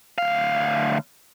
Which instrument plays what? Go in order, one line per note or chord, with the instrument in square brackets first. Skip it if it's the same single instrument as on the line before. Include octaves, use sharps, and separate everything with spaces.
[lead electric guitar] D2 F5